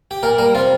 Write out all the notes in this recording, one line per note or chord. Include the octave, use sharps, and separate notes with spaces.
G4
A#2 A#4
G3 A#4
C3 F4